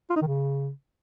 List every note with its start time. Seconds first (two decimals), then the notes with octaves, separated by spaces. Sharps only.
0.10 F4
0.16 D#4
0.22 D#3
0.27 C#3